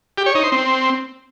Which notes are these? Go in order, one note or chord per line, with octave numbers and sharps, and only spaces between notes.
G4
C#5
D#4
C5
C4